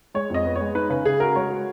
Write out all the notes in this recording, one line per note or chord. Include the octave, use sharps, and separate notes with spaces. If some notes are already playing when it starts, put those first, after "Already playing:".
G#3 C#5
F2 D#5
B3
C#5
G#3
D#4 B4
C#3 B4
C#3 G#4
F#4 A#4
G#3 C#5
F#4